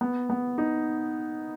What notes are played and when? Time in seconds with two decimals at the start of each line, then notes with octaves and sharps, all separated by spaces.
0.01 B3
0.30 B3
0.58 D#4